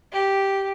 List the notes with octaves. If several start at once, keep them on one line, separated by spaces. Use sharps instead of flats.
G4